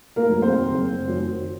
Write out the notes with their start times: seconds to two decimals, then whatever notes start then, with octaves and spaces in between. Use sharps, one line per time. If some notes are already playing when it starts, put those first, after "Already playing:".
0.16 A#3 A#4
0.29 F#2 D#3 F#3
0.42 C4 C5
0.69 F#1
1.08 F#2 D#3 F#3